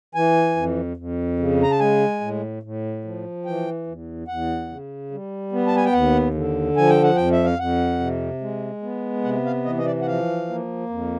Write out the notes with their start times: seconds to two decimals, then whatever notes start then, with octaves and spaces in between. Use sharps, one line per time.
0.15 E3 G#5
0.56 F2
0.97 F2
1.39 C#3
1.63 A#5
1.71 A5
1.79 G#3 G#5
2.21 A2
2.63 A2
3.05 F3
3.45 E3 G5
3.87 E2
4.28 E2 F#5
4.69 C#3
5.11 G3
5.52 B3
5.67 A5
5.76 G#5
5.85 G5
5.93 D#2 F#5
6.34 D3
6.76 F3 G#5
6.89 G5
7.03 F#5
7.16 F2 G5
7.32 E5
7.44 F5
7.58 F2 F#5
8.00 C3
8.41 G#3
8.83 B3
9.24 C3 F#5
9.45 F5
9.65 E3 D#5
9.78 D#5
9.86 D5
10.01 F#5
10.06 F3 F5
10.49 A#3
10.89 F2